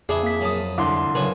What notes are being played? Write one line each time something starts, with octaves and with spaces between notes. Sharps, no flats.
F2 D4 E4 G#4 E5
A#3 B6
F#2 A5 D#6
C2 D3 C6 D6
F#2 C#3 B4 G#5